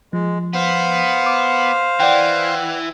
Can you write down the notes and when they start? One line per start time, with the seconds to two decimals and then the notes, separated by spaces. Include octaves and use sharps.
0.13 F3 G#3
0.54 B3 C5 F5
1.26 D6
2.00 E3 D5 F#5 G5